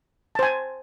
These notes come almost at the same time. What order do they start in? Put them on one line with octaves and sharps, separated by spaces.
A5 C5 G#5